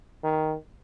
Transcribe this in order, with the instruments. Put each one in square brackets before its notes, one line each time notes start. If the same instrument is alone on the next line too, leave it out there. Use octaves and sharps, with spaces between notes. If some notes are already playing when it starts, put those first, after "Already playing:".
[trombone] D#3